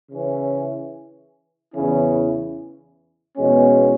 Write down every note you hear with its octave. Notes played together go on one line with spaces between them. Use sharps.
C#3 E3 C#4
E2 C#3 E3 C#4 E4
E2 B2 G#3 C#4